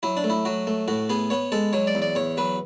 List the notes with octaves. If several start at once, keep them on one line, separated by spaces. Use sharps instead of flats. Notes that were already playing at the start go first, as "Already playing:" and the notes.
F#3 E4
D4
A3
E4
F#3 F#4
A3
A2 F#4
B3 G#4
B3 C#5
G#3 A4
F#3 C#5
D5
E2
D5
E2 C#5
F#3 B4